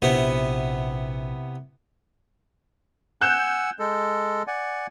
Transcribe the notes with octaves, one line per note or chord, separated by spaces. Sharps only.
A#1 C3 B3 E4
F#5 G#5 E6 F#6 G6 E7
G#3 A4
D5 F#5 G#5